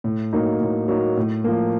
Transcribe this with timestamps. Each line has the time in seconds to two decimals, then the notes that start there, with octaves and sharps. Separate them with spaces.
0.04 A2
0.33 F#3 A#3 D#4
0.61 A2
0.88 F#3 A#3 D#4
1.17 A2
1.44 F3 A#3